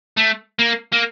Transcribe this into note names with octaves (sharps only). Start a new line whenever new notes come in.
A3
A#3
A#3